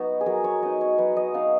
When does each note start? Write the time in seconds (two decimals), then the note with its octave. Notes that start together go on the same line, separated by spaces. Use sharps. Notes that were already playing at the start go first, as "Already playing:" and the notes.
Already playing: F#3 B3 D#4 F#4 B4
0.21 G#4
0.26 F#3 A#4
0.44 C#5
0.63 B3 D#4 D#5
0.81 C#5
0.98 F#3 B4
1.17 D#5
1.34 B3 D#4 F5